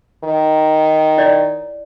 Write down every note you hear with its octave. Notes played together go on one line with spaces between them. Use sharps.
D#3
E4 C#5 D5